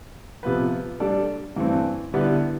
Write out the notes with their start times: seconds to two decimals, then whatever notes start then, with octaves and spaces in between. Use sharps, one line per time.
0.43 C3 F3 B3 F4 B4
1.00 G3 D4 A4 D5
1.56 G2 E3 A3 C4
2.14 D3 G3 B3 E4 B4